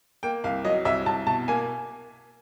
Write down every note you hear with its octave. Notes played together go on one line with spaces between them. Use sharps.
A#3 G5
C2 F5
F#3 D#5
C2 E5
C2 A5
B2 A5
A#3 G#5